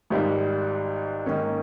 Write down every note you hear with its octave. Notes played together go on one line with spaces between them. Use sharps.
G#1 G#2 G3
G#2 D#3 A#3 C#4